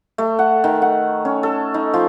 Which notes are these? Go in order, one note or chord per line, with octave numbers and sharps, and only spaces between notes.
A3
F#5
D#3
F#5
C#4
A4
D#4
F3